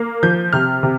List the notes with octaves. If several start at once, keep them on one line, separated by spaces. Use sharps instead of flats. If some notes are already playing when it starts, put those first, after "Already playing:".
Already playing: A#3
F3 G6
C3 F6
C3